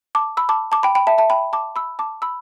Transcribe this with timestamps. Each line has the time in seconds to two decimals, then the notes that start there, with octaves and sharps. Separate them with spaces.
0.15 A5 D6
0.37 B5 E6
0.49 A5 D6
0.72 A5 D6
0.83 G5 B5
0.95 G5 B5
1.07 E5 A5
1.18 E5 A5
1.30 G5 B5
1.53 A5 D6
1.76 B5 E6
1.99 A5 D6
2.22 B5 E6